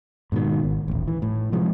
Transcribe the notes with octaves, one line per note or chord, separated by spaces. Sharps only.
G#2 B2 D3 D#3
G#1
D#1 A1
E3
A2
C3 F3 G#3